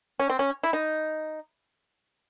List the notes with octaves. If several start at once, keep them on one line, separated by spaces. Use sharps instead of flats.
C#4
C4
C#4
E4
D#4